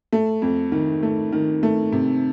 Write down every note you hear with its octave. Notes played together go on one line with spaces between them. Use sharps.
A3
F2
D#3
A3
D#3
A3
C3